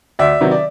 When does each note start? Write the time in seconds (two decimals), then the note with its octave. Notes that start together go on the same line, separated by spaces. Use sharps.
0.19 D2 D5 E5
0.41 C3 D#3 F#3 B3
0.51 D5